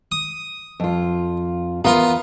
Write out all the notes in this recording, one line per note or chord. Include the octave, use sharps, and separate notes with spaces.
D#6
F2 F4
E2 B3 F4 A#4 F5 A#5